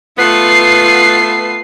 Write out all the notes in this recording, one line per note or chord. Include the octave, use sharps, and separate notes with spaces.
A3 B3 F4 B4 C7